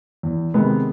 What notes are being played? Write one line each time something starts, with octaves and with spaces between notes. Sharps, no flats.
E2
C3 D#3 G#3 B3